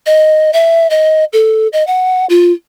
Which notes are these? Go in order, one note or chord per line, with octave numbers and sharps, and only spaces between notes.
D#5
E5
D#5
A4
D#5
F#5
F4